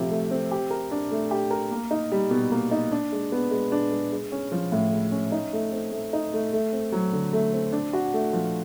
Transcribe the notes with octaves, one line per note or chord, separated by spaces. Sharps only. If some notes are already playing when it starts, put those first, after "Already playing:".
Already playing: C3 F3 A3 C4
A3
C4
G4
A#4
D4
A3
G4
A#4
A#3
D#4
G3
B2
A#3
D#4
D4
G#3
B3
G#3
D4
G#3
G#3
C#4
F3
A2
G#3
C#4
D#4
A3
C4
A3
D#4
A3
A3
C4
F#3
D3
A3
C4
D4
F#4
A3
F3